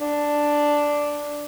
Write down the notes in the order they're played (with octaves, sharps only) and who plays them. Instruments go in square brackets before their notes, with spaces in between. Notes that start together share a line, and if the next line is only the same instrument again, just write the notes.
[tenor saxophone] D4